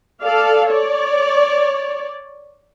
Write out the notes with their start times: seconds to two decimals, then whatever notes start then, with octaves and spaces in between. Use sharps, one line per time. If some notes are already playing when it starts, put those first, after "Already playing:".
0.22 A4 D5 F5
0.69 C#5 D5